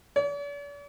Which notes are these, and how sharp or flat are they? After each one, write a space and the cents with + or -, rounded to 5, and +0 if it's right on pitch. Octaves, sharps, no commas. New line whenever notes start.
D5 -45